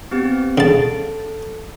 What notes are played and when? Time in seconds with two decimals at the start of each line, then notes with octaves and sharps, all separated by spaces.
0.11 B3 C4 G4
0.58 C#3 A4 A5